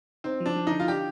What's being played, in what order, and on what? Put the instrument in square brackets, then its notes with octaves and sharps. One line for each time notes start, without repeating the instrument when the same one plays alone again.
[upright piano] C4 [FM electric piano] D#4
[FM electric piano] F3
[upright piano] D4
[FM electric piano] F3
[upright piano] D#4
[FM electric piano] D3
[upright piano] F4
[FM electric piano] D4 [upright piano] G4